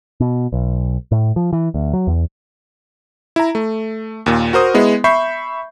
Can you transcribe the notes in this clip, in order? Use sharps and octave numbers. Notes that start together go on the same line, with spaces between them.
B2
B1
A2
F3
E3
D2
F#3
E2
E4 A#5
A3
D#2 A#2
F#4 A#4 C5 D#6
G#3 B3 E4
E5 B5 C#6 G6 C7